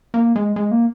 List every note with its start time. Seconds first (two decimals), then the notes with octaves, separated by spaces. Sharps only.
0.14 A#3
0.36 G#3
0.56 G#3
0.71 A#3